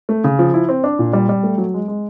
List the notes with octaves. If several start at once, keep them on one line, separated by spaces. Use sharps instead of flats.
A3
C#3
F3
E4
C4
D4
A#2
G3
G3
A3
F#3
G#3
G#3